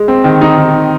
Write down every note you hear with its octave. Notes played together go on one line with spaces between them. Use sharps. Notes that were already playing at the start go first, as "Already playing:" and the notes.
Already playing: G#3
C4
D#3
D#4
D#3